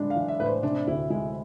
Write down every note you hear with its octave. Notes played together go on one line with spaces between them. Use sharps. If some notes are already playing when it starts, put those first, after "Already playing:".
Already playing: A2 G#3 D4
F5
E3
E5
A2 B4
C5
C3 D4
D2 E4
G#3 E4